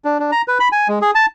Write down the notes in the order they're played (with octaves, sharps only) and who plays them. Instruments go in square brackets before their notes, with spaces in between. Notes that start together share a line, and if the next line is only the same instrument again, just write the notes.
[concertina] D4
D4
A#5
B4
B5
G#5
G#3
G#4
A5